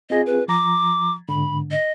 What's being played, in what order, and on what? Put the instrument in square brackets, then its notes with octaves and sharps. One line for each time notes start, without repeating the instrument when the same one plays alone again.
[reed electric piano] C4 F4 G#4 [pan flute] D#5
[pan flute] B4
[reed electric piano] F3 A#5 [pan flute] D6
[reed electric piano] G#2 D3 [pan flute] B5
[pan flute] D#5